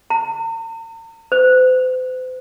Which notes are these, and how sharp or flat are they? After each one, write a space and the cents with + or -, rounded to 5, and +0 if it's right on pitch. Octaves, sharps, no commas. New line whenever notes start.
A#5 -45
C5 -40